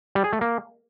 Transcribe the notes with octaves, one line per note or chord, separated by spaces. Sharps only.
G3
G#4
A3
A#3